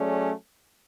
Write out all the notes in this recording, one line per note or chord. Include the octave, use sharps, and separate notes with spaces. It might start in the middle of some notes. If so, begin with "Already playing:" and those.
Already playing: F#3 A3 C#4 G#4 D5